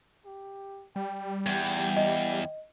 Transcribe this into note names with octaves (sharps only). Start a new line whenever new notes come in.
G4
G3 G5
E2 G5
D#5